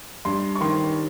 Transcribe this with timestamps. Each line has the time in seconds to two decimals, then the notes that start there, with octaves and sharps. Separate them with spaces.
0.25 G2 C6
0.55 C#6
0.61 D#3 C6